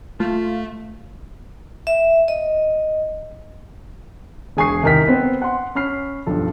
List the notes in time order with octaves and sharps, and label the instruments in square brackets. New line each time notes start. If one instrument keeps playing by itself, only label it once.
[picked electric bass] A3 [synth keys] F4
[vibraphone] E5
D#5
[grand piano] E1 G#4 G#5 C#6 D#6 C7
C2 D#3 A#4 G5 B6
B3 C4 C5
F#5 C6
C#4 B5 F6 C7
B1 G2 F3 A4